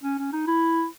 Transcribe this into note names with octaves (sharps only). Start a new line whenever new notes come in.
C#4
C#4
D#4
E4